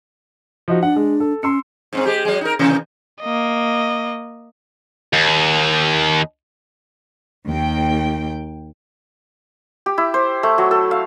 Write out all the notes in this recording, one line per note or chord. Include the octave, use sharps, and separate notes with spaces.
F3 D#4 F#4
D4 F#5
G#3
A4
C#4 C6 E6 C#7
G#2 B3 C4
G#3 G4
F#3 G#3
D#4 A#4
C3 E3 A#3
A#3 D#5
D#2
D#2 G5
G4
E4
C5
A3
F#3
A4
F5